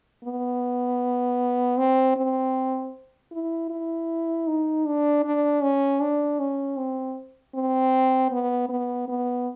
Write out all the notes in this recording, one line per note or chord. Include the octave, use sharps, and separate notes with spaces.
B3
C4
C4
E4
E4
D#4
D4
D4
C#4
D4
C#4
C4
C4
B3
B3
B3